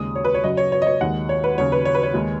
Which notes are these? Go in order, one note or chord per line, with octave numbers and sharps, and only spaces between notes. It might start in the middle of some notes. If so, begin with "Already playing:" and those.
Already playing: D#2 C#3 G#3 D#6
C#5
B4
C#5
F#2 C#3 F#3 D#5
C#5
C#5
D#5
C#5
D#2 D#3 G#3 F#5
C#5
B4
D#2 C#3 F#3 C#5
B4
C#5
B4
C#5
D#2 D#3 G#3